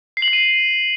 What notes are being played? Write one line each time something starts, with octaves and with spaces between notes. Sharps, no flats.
C7
F#7
C7
D#7